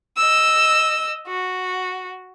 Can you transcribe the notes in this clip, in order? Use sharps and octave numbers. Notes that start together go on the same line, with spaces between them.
D#5 E6
F#4